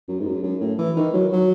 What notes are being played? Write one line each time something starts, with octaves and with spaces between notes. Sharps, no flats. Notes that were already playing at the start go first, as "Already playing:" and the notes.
F#2
G#2
F#2
F#2
A2
E3
D#3
F#3
F#3